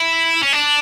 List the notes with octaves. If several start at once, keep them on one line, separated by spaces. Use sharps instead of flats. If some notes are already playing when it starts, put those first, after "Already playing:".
Already playing: E4
C#4
D4